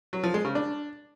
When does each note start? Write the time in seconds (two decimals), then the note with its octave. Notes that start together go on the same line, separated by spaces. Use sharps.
0.13 F#3
0.23 F3
0.34 G#3
0.45 C#3
0.55 D4